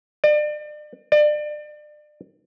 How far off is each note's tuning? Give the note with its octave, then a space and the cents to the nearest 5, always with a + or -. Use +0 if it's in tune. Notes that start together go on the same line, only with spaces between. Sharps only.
D5 +35
D5 +30